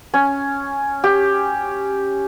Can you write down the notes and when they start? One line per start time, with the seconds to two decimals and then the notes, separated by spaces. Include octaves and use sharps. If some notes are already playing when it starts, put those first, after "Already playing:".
0.14 C#4
1.04 G4